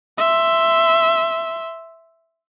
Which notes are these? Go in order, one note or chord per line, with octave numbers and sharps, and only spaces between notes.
E5 C6